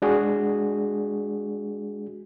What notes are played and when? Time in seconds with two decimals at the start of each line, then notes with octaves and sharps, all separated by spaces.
0.02 G#3 D4 F#4 G#4